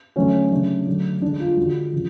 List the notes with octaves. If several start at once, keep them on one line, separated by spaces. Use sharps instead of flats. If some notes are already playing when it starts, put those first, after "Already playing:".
D3 F#3 A3 C#4
C#3 F#3 A3 D4
D3 F#3 A3
D3 G#3 D4
F4
D3 G#3 F#4
C#3 F3